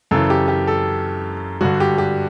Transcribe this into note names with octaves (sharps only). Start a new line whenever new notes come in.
F#2 C#3 E3 A4
G4
G4
A4
G2 D3 F#4
G4
G4